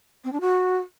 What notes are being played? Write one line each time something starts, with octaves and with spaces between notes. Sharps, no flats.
C4
D4
F#4